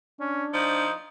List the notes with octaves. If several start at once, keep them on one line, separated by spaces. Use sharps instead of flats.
C#4 D4
F3 D#4